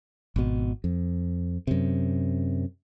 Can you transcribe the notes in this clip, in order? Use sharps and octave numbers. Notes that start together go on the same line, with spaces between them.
G#1 B2
F2
F#2 C3